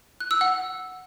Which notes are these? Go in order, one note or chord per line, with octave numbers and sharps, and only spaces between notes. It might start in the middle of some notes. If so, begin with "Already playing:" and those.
F#6
E6
F#5